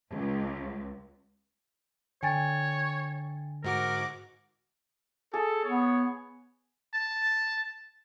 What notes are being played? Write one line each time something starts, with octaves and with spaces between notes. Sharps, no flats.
C#2
D3 C#5 G5 G#5 A6
G#2 F#4 A#4 D6
G#4 A4
B3 C#5
A5